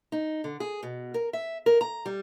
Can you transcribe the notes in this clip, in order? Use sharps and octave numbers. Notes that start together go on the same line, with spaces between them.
D#4
D3
G#4
B2
A#4
E5
A#4
A#5
G3